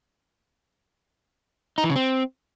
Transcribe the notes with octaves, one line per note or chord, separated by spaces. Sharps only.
D#4
E3
C#3
C4